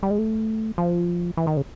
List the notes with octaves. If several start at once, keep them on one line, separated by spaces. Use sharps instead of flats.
G3
G#3
A3
F3
E3
D#3
C#3